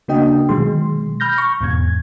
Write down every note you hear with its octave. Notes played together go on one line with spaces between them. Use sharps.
C#3 A#3 D4 F#4 D#5 G5
B2 D#3 F#3 G#3 C6
B5 F6 G6 A#6
C#6
E2 G#2 B2 G#6